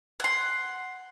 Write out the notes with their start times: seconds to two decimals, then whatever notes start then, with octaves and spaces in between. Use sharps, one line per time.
0.20 F#5 C6